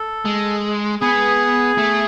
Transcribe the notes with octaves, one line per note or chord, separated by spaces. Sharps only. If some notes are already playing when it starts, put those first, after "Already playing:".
Already playing: A4
G#3
B3 G#4
A3